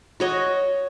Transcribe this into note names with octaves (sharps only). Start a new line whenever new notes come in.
F#4 C#5 D#5